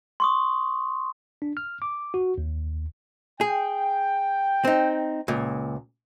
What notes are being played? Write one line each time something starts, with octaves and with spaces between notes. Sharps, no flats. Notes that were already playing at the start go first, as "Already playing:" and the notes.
C6 C#6 D#6
D4
F6
D6
F#4
D#2
G#4 G5
C4 D#4
C#2 A#2